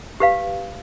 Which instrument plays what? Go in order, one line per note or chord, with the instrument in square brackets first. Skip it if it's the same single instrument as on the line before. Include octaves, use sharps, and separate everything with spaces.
[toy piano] G4 B4 F5